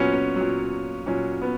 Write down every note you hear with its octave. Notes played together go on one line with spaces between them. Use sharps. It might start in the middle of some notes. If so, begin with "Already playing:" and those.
Already playing: A#2 F#3 B3 C#4
C#4
A#2 F#3
A#2 F#3 C#4
B3